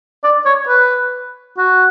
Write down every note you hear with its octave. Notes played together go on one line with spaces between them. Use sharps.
D5
C#5
B4
F#4